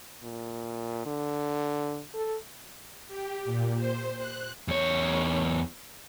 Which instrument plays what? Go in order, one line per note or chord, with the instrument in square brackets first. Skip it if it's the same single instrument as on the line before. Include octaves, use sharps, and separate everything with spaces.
[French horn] A#2
D3
A4
[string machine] G4
A#2
C5
F#6
[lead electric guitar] E2 C#5